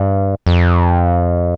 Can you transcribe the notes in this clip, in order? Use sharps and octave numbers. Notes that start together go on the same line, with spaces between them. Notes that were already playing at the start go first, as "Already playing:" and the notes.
Already playing: G2
F2